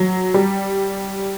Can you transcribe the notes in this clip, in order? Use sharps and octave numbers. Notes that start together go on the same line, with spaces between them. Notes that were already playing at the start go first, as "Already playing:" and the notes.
Already playing: F#3
G3